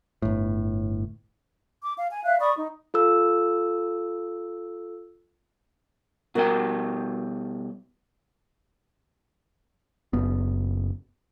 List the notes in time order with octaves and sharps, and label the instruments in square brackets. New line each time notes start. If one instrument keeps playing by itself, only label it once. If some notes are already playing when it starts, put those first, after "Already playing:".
[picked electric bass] G1 A2
[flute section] D6
F5
G#5
E5 F5 F#6
D5 B5 C#6 D#6
D#4
[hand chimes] F4 A4 E6
[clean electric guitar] B2 G3 G5 [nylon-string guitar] F#4 A#4
[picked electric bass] F#1 B3